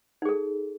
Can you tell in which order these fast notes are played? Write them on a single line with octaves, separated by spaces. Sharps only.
D#4 G#4 A4